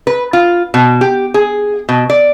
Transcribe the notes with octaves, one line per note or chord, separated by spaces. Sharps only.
B4
F4
B2
G4
G#4
B2
D5